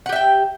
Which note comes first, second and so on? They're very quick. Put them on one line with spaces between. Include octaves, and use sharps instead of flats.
F#5 G4 E5 G5